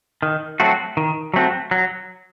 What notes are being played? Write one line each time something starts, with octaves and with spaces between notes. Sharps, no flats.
D#3
F#3 A3 C4 F#4
D#3
F#3 A3 C4 F#4
F#3